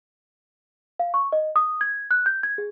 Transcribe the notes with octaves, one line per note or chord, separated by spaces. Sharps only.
F5
C#6
D#5
D#6
G#6
F#6
G6
G#6
G#4